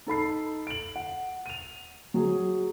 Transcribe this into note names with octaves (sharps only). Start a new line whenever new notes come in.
D#4 A4 B5 C7
D7 F#7
F#5
D#7 F7
F#3 G#4